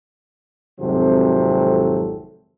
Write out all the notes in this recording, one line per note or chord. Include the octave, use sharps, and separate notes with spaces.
G#1 F2 C3 F#3 A4 C5